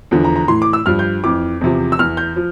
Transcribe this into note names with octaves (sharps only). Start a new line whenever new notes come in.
E2 D3 F3
A#5
A#5
A2 E3 C6
D6
E6
G2 F3 F6
G6
F2 E3 D6
E2 C3 F3
E6
E2 E3 F6
G6
F3